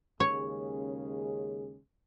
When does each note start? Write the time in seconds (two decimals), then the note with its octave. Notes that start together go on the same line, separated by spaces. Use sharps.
0.20 D#2 C#3 G#3 C#4 G#4 C#5